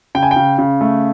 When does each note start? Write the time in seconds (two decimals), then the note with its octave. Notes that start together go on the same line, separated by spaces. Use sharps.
0.15 C#3 G5
0.23 G#5
0.31 G5
0.36 C#3
0.59 C#3
0.81 A3